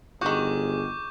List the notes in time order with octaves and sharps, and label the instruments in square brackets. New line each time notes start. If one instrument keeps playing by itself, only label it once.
[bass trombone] G1 [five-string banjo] D#3 F#4 [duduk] G#4 [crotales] C#6 D6 G6